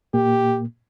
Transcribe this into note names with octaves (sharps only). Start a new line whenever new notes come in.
A#2 A#3 G4